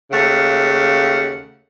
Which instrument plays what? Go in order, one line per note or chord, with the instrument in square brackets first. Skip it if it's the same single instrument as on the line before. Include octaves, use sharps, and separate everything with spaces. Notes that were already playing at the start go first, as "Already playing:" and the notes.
[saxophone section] D#2 C#3 A3 F#5